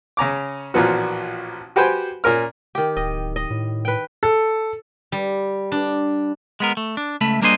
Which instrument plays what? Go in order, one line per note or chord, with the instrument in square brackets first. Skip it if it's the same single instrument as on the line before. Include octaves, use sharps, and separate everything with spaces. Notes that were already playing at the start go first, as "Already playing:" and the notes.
[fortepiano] C#3 C#4 A#5 D6
A1 A#2 F3 B3 F#4
F#4 G4 B4 C5 G5 G#5
A#2 C#4 A#4 F6
[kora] D#3 G4
[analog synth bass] D1 [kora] D#5
[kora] D#5
[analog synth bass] A2
[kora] B4 G5
[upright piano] A4
[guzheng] G3
D4
[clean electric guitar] G#3 B3 A#4
A3
D4
C#2 A3 E5 B5
G3 A#3 D4 G#4 C5 D#5